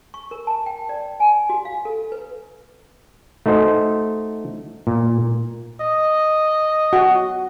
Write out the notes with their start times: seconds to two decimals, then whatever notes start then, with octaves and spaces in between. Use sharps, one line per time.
0.14 C#6
0.31 A#4
0.47 A5
0.66 G5
0.89 D5
1.20 G#5
1.50 F#4
1.65 F5
1.85 A4
2.12 B4
3.46 A3 D#4 F#4 C5 D#5
4.87 A#2
5.81 D#5
6.93 F#4